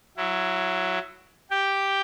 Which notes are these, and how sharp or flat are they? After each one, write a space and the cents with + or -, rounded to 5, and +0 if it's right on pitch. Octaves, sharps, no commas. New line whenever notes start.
F#3 +0 E4 +20
G4 +0 G5 +0